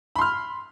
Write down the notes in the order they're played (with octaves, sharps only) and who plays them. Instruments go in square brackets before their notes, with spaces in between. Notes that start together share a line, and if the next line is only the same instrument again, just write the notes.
[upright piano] B5
C6
F6